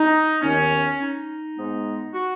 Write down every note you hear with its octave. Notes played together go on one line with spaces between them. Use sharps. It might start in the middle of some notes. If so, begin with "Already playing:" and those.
Already playing: D#4
D#2 D#3 B3 C#4
D#4
G#2 G#3 B3
F#4